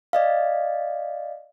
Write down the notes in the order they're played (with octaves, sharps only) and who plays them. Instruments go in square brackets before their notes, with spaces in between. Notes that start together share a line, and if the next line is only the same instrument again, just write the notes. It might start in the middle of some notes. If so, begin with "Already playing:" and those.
[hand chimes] D5 D#5 F5